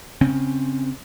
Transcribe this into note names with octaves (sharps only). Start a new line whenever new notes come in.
C#3 C4 C#4